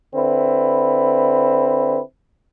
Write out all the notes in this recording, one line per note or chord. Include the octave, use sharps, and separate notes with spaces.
D3 C4 E4 B4